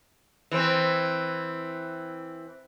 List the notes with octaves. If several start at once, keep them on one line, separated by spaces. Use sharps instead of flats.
E3 C4